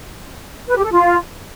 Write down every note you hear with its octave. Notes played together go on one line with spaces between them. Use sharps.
B4
G4
A4
F4